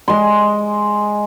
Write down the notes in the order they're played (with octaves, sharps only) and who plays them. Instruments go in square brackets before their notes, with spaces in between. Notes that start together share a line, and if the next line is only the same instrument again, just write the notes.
[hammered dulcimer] G#3 C6